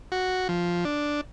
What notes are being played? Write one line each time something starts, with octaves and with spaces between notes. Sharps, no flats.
F#4
F3
D4